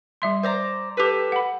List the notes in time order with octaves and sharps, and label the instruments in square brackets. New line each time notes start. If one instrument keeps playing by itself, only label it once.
[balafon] G3 E5 C6
[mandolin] C5 D5 A#5
G4 A4 B4
[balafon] F#5 B5